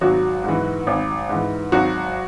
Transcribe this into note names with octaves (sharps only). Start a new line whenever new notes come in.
G#1 F#3 F#4
G#2 E3
G#1
G#2 E3
G#1 F#3 F#4